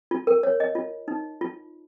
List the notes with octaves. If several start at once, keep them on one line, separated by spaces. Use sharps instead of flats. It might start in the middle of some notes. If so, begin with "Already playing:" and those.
F4
A#4
C#5
D#5
F4
D#4
F4